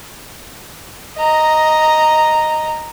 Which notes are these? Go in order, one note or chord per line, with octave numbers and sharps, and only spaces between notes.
D#5 A#5